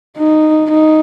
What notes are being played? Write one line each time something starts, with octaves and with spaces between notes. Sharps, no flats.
D#4
D#4